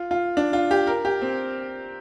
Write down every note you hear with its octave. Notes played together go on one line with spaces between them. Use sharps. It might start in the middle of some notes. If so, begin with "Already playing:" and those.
Already playing: F4
F4
D4
F4
G4
A#4
G4
C4